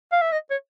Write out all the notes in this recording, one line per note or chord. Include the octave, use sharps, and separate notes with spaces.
F5
E5
D#5
C#5